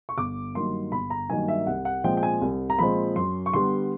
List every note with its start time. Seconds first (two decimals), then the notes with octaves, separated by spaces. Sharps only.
0.09 C#6
0.17 G1 D6
0.55 G2 D#3 F#3 A#3 C6
0.92 G1 B5
1.10 A#5
1.29 G2 D#3 F#3 A#3 G#5
1.48 E5
1.67 C2 F#5
1.85 F#5
2.04 A#2 F3 G#3 C4 G5
2.17 G5
2.23 G#5
2.42 C2
2.70 A#5
2.79 A#2 F3 G#3 C4 B5
3.16 F#2 C6
3.46 C#6
3.53 D3 G3 B3 C6